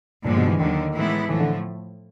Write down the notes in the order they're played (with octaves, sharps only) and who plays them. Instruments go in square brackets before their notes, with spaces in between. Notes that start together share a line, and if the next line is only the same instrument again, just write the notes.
[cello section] G2 D3 F3 G#3 [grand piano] A#2
[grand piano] B2
E3
[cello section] D#2 D3 F#3 [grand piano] D#3
[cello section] A2 E3 G#3 B3 E4
[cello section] A2 F3 A3 [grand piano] E3
[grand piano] D3